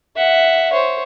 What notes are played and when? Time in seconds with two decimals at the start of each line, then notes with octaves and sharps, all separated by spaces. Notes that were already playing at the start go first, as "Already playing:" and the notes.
0.16 E5 F#5
0.72 C5 C#5